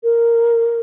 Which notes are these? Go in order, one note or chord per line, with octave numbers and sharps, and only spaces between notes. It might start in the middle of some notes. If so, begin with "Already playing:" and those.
A#4